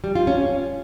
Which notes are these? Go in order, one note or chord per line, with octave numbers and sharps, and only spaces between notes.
G3
F4
C#4